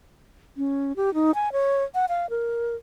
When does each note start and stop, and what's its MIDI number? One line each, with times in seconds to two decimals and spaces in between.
0.57 0.93 61
0.96 1.13 67
1.14 1.31 63
1.35 1.52 80
1.52 1.83 73
1.95 2.06 78
2.09 2.30 77
2.30 2.75 70